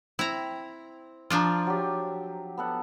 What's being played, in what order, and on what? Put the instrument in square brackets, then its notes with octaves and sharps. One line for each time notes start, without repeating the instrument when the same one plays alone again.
[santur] C4 [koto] E4 A#5
[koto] F3 D4 F4 [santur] A#5 E6
[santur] F#3 G4
B3 A4 F#5